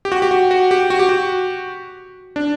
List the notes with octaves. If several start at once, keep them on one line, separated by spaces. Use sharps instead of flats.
G4
F#4
G4
F#4
F#4
G4
F#4
G4
F#4
D4